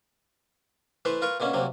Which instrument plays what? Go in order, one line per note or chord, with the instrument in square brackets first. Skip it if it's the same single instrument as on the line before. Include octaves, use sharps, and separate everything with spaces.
[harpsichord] E3 A3 B4 C5
F4 A#4 B4 C#6
B2 D3 A#3 C#4
D2 C3 F#3 A#3